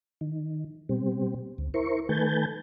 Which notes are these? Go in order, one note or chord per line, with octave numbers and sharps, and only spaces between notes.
D#3
B2 G3 C4
D2
E4 A#4 C5 C#6
D#3 A3 B4 G#5 A5 G6